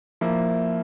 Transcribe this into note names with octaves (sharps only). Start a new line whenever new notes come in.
F3 A#3 E4